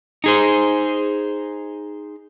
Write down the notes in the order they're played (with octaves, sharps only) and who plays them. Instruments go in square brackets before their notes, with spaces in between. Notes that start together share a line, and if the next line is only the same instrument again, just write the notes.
[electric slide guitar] D#4 G#4 C5